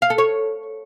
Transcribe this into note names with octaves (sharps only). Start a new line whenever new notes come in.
F5
A4
C#5